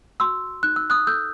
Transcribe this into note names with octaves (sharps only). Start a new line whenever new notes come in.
F#4 C6 E6
D#4 F#6
E6
D#6 F#6
A4 E6 G6